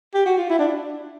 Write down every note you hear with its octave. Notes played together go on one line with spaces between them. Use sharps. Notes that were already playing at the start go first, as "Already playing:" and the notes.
G4
F#4
F4
E4
D4